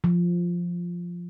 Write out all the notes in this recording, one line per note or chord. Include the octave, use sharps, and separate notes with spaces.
F3